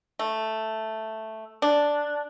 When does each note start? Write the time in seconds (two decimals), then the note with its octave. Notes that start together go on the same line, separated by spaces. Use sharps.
0.19 A3
1.62 D4